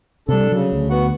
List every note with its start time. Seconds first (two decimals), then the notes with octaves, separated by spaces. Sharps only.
0.29 C3 G3 D4 A4
0.52 C#3 F#3
0.72 D2
0.90 B3 F#4 F#5